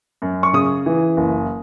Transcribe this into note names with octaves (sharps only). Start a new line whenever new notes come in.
F#2
C#6
C#3 D#6
E3
F#1